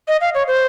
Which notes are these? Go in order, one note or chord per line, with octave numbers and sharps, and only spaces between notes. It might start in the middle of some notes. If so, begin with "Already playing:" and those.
D#5
F5
C#5
C5